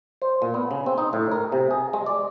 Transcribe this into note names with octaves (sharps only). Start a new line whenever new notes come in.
C5
A#2
B3
C#3
C4
D#4
A2
A#4
C3
G#4
G#3
D5